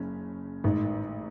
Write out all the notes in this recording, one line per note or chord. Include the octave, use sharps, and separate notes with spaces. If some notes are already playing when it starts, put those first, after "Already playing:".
Already playing: F#1 C#3 C#4
A1 G#2 D#3